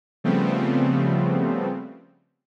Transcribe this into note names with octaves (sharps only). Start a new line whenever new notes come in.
C#3 F3 G3 A3 B3 C4